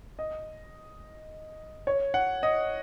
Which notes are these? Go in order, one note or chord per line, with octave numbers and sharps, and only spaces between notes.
D#5
C#5
F#5
D#5